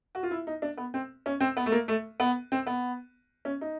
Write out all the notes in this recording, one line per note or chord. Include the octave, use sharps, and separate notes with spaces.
F#4
F4
E4
D#4
D4
B3
C4
C#4
C4
B3
A3
A#3
A3
B3
C4
B3
C#4
D#4